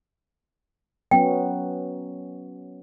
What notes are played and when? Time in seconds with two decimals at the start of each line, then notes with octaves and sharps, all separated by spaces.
1.11 F#3 B3 C#4 G5